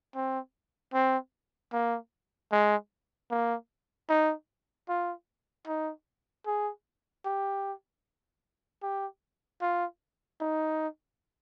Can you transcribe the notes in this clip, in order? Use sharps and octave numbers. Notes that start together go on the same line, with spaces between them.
C4
C4
A#3
G#3
A#3
D#4
F4
D#4
G#4
G4
G4
F4
D#4